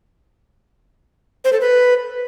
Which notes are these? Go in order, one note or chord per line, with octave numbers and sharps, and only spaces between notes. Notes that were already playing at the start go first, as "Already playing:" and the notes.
C5
A4
B4